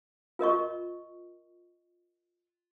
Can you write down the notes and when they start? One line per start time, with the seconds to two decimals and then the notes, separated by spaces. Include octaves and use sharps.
0.39 F4 A#4 D#5 C#6